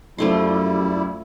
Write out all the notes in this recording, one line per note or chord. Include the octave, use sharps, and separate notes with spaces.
F#2 F3 G3 A3 E4 C6